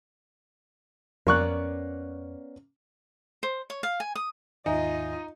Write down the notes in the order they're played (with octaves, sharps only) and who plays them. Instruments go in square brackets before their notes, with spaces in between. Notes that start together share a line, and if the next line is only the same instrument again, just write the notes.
[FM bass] F2 [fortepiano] A#3 C#6 F#6 [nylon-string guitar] B3 C#4 D5
[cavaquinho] C5
C#5
F5
G#5
D#6
[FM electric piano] D#2 G#2 D#3 [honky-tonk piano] D#4 [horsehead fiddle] F4 D#5 [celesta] E5 G#5